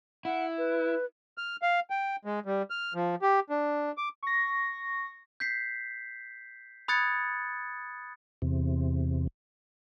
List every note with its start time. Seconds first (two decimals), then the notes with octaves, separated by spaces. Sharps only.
0.25 E4 F#5
0.58 B4
1.38 F6
1.62 F5
1.90 G5
2.25 G#3
2.46 G3
2.70 F6
2.94 F3
3.22 G4
3.50 D4
3.98 D6
4.23 C#6 A#6
5.40 G6 B6 C7
6.88 B5 D#6 F#6 G#6 A6 C#7
8.42 E2 C3